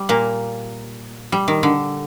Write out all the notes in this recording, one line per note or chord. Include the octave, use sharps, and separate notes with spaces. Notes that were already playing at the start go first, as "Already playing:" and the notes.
Already playing: G3
A#2 A#3
G3
D#3
D3